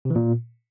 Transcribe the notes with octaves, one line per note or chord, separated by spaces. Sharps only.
C3
E3
A#2